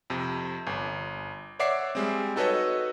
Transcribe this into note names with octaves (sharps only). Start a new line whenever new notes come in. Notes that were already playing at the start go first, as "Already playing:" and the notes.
F2 C3
G1
C#5 D5 E5 F#5 D6 C7
G3 G#3 C4
D#4 F#4 A4 B4 C#5 D#5